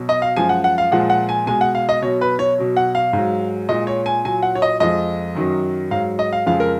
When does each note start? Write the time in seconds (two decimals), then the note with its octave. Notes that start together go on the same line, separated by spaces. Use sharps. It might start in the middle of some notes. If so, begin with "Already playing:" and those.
Already playing: B2 F#3
0.09 D#5
0.22 F5
0.36 F#2 F3 G#3 G#5
0.49 F#5
0.64 F#5
0.78 F5
0.91 A#2 F3 G#3 F#5
1.10 F#5
1.29 G#5
1.46 B2 G#3 G#5
1.61 F#5
1.75 F5
1.89 D#5
2.02 B2 F#3 C#5
2.21 B4
2.39 C#5
2.58 B2 F#3
2.77 F#5
2.95 F5
3.13 G#2 F#3
3.69 A#2 G#3 D#5
3.87 C#5
4.06 G#5
4.25 A#2 F#3 G#5
4.43 F#5
4.55 C#5
4.62 D#5
4.80 F2 F3 G#3 D#5
5.35 F#2 D#3 F#3
5.91 G#2 F#3 F5
6.19 D#5
6.33 F5
6.46 F2 C#3 F3 G#3 F5
6.60 A#4